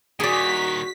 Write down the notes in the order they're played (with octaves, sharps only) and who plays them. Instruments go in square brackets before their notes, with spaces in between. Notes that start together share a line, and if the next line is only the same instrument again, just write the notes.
[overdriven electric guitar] A#2 D#3 [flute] F#4 [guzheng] G#4 D5 [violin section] B6